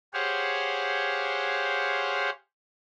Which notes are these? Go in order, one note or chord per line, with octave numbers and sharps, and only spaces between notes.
G4 G#4 C5 C#5 F5 F#5